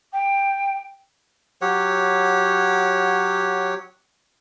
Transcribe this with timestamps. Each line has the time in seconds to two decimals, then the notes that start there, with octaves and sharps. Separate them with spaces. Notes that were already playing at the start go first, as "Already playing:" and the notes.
0.13 G5
1.62 F#3 G4 C#5 F#5